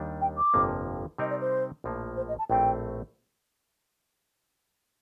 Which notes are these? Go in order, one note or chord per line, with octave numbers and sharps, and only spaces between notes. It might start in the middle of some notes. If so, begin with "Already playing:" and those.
Already playing: D#2 D#3 G3 D4
G5
D6
G1 F2 C3 F3 A#3
C3 G3 C4 D#4 A#4 D#5
D5
C5
A#1 A2 F3 A#3
C5
D#5
A5
A#1 A2 A3 C4 G5